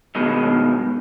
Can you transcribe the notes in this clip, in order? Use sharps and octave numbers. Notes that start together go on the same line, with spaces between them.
G2 B2 D#3 F#3 G#3